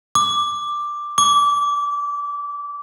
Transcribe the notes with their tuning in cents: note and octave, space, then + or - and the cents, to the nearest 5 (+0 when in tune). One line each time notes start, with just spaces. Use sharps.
D6 +5
D6 -25